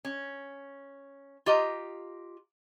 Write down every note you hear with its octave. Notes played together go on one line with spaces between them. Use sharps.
C#4
F4 G4 D#5 A#5